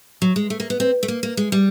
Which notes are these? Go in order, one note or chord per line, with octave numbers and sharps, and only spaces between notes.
F#3
G#3
A3
A#3
B3
C4
A3
A#3
A#3
G#3
G3